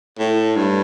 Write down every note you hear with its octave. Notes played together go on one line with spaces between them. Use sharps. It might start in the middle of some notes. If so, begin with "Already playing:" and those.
A2
G2